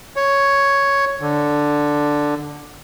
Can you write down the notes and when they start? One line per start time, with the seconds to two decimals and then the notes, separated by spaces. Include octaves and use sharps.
0.16 C#5
1.21 D3